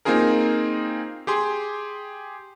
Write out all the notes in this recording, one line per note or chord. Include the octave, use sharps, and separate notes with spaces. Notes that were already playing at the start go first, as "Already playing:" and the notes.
A#3 C4 D#4 F4 G#4 A#4
G4 G#4 C6